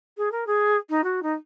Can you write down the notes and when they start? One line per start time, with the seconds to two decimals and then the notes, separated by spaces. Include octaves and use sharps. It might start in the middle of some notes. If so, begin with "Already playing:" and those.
0.17 G#4
0.32 A#4
0.47 G#4
0.90 D#4
1.04 F#4
1.23 D#4